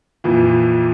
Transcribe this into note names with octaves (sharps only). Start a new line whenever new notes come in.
F2 A#2 E3